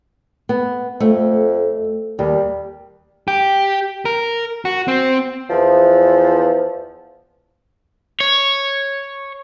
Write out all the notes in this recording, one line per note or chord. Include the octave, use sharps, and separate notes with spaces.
B3
F2 A3
D#2 G3
G4
A#4
F#4
C4
E2 F3
C#5